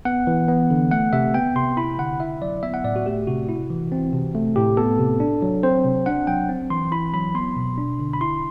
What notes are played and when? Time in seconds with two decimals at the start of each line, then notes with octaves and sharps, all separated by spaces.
0.05 B3 F#5
0.27 E3
0.48 B3
0.70 D3
0.91 A3 F#5
1.13 C3 E5
1.34 B3 G5
1.56 C3 C6
1.77 E4 B5
1.98 D3 F#5
2.20 E4 E5
2.42 F#3 D5
2.63 B3 E5
2.74 F#5
2.84 A2 D5
2.96 F#4
3.06 A3 G4
3.27 C3 F#4
3.49 E4
3.70 E3
3.92 C4
4.13 C3
4.35 A3
4.56 A2 G4
4.77 B3 A4
4.99 C3
5.20 D4
5.42 F#3
5.63 C4 C5
5.85 C3
6.06 D4 F#5
6.27 F#3 G5
6.49 C4
6.70 E3 C6
6.92 E4 B5
7.14 F#3 B5
7.35 B3 C6
7.56 B2
7.78 D4
8.00 D3
8.13 B5
8.21 E4 C6